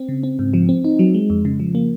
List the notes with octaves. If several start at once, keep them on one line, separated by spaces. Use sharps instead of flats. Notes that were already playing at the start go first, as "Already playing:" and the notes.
Already playing: C4
C#3
C4
G#2
F3
C4
D#4
F#3
G#3
F2
C#3
F3
A#3